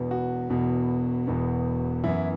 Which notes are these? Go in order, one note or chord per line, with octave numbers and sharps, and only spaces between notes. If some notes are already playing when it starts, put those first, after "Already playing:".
Already playing: E1 E2 B2 B3
F#4
E1 E2 B2 B3
E1 E2 B2 B3
F#2 E3 B3 E4